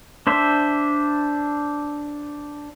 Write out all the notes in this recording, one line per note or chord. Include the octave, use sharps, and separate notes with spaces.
D4 C5 E5